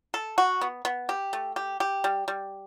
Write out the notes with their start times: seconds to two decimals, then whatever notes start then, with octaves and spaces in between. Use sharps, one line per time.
0.14 A4
0.38 F#4
0.61 B3
0.85 B3
1.09 G4
1.33 A3
1.56 G4
1.80 G4
2.04 G3
2.28 G3